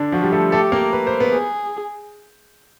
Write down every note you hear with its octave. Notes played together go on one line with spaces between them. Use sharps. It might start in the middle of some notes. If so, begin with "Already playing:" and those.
Already playing: D3 D4
F3 F4 F#4
G3 G4
A3 A4
A3 G4 A4
A#3 A#4
B4
C5
B3 B4
G#4